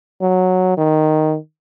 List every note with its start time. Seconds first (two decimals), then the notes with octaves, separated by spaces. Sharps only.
0.22 F#3
0.78 D#3